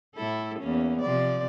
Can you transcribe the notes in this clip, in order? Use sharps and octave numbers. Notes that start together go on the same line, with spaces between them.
A2 E4 A4
E2 A#3 C#4
C3 F3 D5